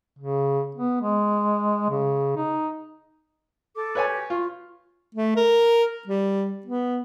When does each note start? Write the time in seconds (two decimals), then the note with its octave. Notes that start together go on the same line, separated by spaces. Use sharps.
0.19 C#3
0.75 B3
1.01 G#3
1.90 C#3
2.36 D#4
3.75 A4 D6
3.95 B4 C#5 G#5
4.09 G4
4.30 F4 C#6
5.15 A3
5.36 A#4
6.07 G3
6.66 B3